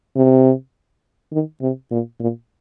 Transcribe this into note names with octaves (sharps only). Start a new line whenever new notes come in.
C3
D#3
C3
A#2
A#2